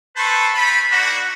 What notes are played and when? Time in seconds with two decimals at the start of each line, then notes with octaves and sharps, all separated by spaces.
0.16 A4 B4 C5 A5 B5 C#6
0.53 C4 F4 B5
0.90 A#3 D4 D#4 F#4